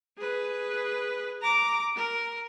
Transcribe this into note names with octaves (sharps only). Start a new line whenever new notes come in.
G#4 B4
A#5 D6
A#4